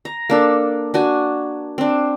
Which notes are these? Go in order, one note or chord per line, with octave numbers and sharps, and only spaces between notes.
A#5
A#3 D4 A4
D4 F#4 G#5
C4 D4